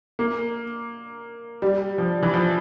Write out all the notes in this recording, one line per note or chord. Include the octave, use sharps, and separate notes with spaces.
A#3
G3
F3
E3
F3